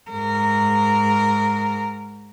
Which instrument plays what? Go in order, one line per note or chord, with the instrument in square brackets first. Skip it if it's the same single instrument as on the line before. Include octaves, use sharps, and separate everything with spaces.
[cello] G#2 A#4